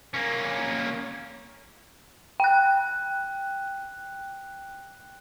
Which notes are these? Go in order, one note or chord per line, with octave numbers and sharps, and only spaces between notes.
A#3 C#4
G5 F#6